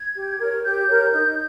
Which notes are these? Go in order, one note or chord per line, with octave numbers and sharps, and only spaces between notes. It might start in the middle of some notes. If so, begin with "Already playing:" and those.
Already playing: G#6
G4
A#4 C#5
G4 G6
A#4 C#5
D#4